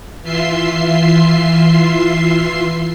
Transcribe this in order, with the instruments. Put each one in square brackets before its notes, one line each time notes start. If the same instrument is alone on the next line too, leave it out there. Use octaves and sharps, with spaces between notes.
[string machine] E3 F4 E5 C6 C7